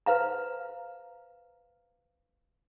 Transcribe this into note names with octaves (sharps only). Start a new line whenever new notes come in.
B4 C5 F5 A#5